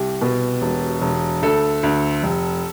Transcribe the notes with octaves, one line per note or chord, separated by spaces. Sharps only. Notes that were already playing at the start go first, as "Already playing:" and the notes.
Already playing: C2 G4
B2
E1
E1
D2 A4
D2
F1